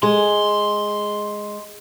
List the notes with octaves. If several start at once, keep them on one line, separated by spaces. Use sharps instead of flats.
G#3 C6